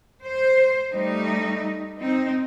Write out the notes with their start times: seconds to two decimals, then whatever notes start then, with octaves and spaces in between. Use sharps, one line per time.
0.24 C5
0.92 G3 A3 D#4
1.99 C4 D#4